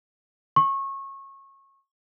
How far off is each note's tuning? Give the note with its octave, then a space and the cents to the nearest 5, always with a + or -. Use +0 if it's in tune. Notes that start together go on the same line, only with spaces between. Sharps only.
C#6 -25